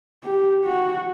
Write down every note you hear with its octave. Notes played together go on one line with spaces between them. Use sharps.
G4
F#4